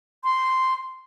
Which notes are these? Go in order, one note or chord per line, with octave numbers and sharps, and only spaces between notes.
C6